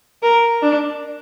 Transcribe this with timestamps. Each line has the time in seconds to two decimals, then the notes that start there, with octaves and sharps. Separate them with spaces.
0.23 A#4
0.62 D4